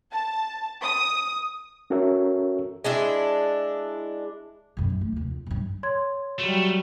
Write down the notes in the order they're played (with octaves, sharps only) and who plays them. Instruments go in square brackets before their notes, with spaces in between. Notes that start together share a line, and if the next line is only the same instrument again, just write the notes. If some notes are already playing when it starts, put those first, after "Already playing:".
[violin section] A5
D#6
[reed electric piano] C#4 F#4 A4 A#4 C#5 E5
[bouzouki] G#3 D4 E4
[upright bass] B1 F#2
A#1
A3 A#3
F1 D#2
F4
B1 G2
[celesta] C#5 C6 G#6
[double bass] F#3 G3 [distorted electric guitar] A3